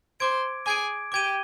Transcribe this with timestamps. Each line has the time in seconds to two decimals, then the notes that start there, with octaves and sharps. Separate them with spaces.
0.20 C5 C6 D6 G#6 D7
0.66 G#4 G#5 D6 G#6 D7
1.12 G4 G5 D6 G#6 D#7 G7